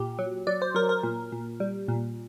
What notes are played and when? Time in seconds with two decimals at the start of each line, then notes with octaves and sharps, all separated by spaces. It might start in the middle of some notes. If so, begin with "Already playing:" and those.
Already playing: A#2 G4
0.19 F#3
0.47 F#3 D5
0.62 C5
0.75 F#3 A#4
0.89 A#4
1.03 A#2
1.32 A#2
1.60 G3
1.88 A#2